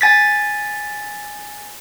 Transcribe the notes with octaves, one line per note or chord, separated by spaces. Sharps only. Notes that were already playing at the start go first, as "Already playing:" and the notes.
G#5 A6 B6